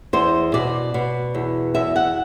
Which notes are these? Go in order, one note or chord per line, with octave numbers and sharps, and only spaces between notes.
E2 C5
B2 D5
B2
E2
E2 E5
F#5